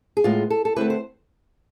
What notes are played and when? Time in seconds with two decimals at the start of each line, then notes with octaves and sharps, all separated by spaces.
0.17 G#4
0.24 A2 G#3 B3 F4
0.50 A4
0.65 A4
0.76 D3 A3 C4 E4 B4
0.90 C5